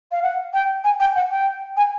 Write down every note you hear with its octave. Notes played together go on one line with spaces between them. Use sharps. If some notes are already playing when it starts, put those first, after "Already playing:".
F5
F#5
G5
G#5
G5
F#5
G5
G#5